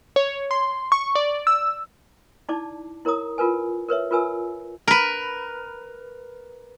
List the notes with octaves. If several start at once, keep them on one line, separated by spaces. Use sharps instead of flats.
C#5
C6
C#6
D5
E6
D#4 E4 D5 A5 D6
E4 A#4 C#5 A#5 D#6
F4 A#4 B4 G#5
A#4 B4 C#5 E5
F4 A#4 B4 G#5 E6
A#4 B4